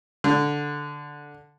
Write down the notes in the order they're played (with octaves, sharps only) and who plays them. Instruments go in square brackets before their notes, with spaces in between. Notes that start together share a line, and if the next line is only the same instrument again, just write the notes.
[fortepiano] D3